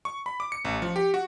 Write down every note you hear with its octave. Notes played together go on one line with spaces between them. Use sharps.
C#6
B5
D6
C#7
A1
F3
G4
F#4